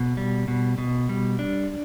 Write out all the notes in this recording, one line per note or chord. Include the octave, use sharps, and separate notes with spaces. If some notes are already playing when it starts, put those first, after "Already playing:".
Already playing: B2
G3
B2
B2
G3
D4